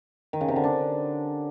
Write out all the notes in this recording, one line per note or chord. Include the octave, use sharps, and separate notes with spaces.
D#3
C#3
C3
D3
D4